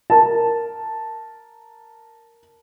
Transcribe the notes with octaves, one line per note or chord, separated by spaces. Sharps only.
A#4 A5